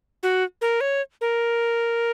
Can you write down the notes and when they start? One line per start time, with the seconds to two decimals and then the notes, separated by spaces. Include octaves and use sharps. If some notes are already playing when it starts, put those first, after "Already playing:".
0.23 F#4
0.61 A#4
0.81 C#5
1.21 A#4